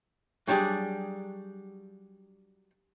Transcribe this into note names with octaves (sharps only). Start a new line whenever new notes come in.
F#3 G3 D4 G4 G#4